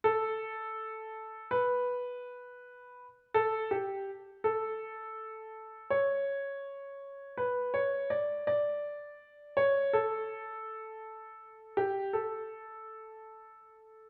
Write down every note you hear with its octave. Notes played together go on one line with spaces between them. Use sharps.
A4
B4
A4
G4
A4
C#5
B4
C#5
D5
D5
C#5
A4
G4
A4